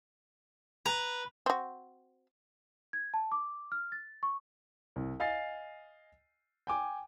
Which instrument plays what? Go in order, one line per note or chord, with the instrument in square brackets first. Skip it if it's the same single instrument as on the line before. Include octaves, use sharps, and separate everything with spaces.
[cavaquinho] B4 [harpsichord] A#5
[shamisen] C4 F#4
[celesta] G#6
A5
D6
F6
A6
C#6
[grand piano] C2
D#5 F5 G#5 A6 C7
G5 G#5 D6